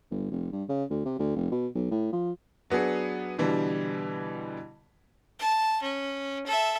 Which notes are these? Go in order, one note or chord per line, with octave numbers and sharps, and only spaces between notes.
G1
F1
G2
C#3
D2
C3
D2
F1
B2
B1
A2
F3
F#3 B3 D4 G#4
B2 D3 E3 G3
A5
C#4
A4 E5